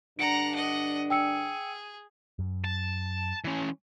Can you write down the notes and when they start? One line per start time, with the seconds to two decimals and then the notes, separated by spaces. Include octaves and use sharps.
0.19 G2 D3 D4 F#5 A#5 C#7 D7
0.55 D#5 F#5
1.10 G#4 G5 E6 C#7
2.39 F#2
2.65 A5
3.45 E3 C#4